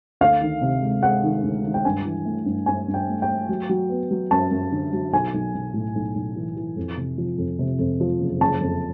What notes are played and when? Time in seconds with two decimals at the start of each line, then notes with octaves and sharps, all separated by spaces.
0.21 D2 F5
0.41 D#3
0.61 C3
0.82 G#3
1.02 G#3 F#5
1.24 D#3
1.43 D2
1.65 D#3
1.74 G5
1.85 G2 G#5
2.05 E3
2.25 A3
2.46 G2
2.66 G2 G#5
2.88 G2
2.94 G5
3.08 A3
3.22 G5
3.28 A3
3.49 F#3
3.69 F#3
3.89 B3
4.11 F#3
4.31 F#2 A5
4.51 F#2
4.72 D3
4.93 F#3
5.13 B1 G#5
5.34 B1
5.54 B1
5.74 A2
5.95 B1
6.15 B1
6.36 E3
6.56 E3
6.76 F2
6.97 C3
7.18 F3
7.38 F2
7.59 C3
7.79 F2
8.00 F3
8.21 F#1
8.40 F#1 A5
8.61 F2